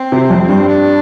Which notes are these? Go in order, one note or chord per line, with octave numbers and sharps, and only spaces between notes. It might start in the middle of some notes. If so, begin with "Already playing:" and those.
Already playing: C4
C3
F2
G2
D4